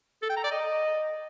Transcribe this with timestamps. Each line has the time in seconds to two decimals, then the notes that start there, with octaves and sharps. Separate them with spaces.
0.22 A4
0.30 G5
0.37 A#5
0.44 D5
0.52 D#5